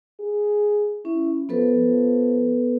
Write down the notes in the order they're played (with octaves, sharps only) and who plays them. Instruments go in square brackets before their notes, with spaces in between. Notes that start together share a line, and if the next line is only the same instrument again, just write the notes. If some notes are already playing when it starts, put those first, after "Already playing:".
[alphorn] G#4
[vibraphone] C#4 [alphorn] E4
[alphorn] F3 [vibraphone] B3 A4 B4
[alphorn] F3